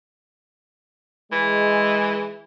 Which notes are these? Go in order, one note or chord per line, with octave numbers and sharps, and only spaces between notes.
E3 G#3